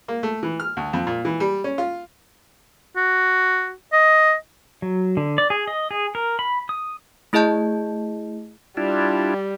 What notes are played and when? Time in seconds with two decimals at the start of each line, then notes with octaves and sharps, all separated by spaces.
0.08 A#3
0.23 A3
0.43 E3
0.60 F6
0.77 D2
0.93 F2
1.07 A#2
1.25 E3
1.40 G3
1.64 C#4
1.78 F4
2.96 F#4
3.93 D#5
4.82 F#3
5.17 D3
5.38 D5
5.50 G#4
5.67 D#5
5.91 G#4
6.15 A#4
6.39 B5
6.69 D#6
7.33 A3 E4 G#4 D#5 A5 G6
8.77 G3 D4 E4 F4